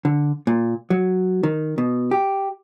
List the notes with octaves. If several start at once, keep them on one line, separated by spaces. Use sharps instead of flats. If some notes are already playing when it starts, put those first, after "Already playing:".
D3
A#2
F#3
D#3
B2
G4